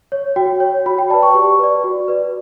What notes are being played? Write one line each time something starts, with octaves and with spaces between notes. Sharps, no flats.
C#5
F#4 G5
C#5
F#4 B5
G5
B4 D5 A5
C#6
G4 C#6
B4 D5
F#4
B4 D5